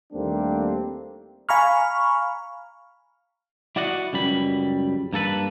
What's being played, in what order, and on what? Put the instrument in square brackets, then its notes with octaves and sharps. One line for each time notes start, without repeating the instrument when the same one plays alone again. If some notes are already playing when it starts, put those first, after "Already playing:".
[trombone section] D#2 G3 A3 A#3 C4 D4
[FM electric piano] F5 G#5 A#5 B5 C#6 F6
[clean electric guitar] E4 F#4 D5 D#5 F#5
C#2 F#2 G3 B5
G2 A#3 A4 B4